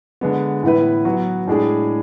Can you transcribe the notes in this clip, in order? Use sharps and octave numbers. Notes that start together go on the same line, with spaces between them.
D3 G#3 B3
A2 E3 B3 E4 B4
F#3 B3 F#4
A2 G#3 D4 G#4